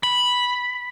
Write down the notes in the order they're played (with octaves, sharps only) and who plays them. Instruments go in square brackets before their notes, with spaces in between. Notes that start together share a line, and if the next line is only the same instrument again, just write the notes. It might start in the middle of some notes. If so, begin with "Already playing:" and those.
[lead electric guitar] B5